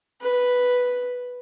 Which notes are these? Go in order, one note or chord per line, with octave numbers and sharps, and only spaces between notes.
B4